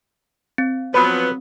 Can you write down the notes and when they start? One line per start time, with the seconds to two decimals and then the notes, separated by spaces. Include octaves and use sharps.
0.58 C4
0.94 F3 F#3 B3 B4